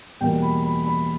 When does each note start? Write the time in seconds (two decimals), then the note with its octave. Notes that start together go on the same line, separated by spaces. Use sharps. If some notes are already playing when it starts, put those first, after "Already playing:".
0.21 E2 B2 G3 A#3 G5
0.42 B5
0.64 B5
0.86 B5